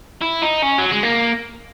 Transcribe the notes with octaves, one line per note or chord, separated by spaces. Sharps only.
E4
D#4
C#4
F#3
G#3
A#3